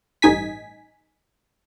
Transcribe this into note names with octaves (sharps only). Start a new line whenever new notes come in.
A1 G2 D#4 G#5 B6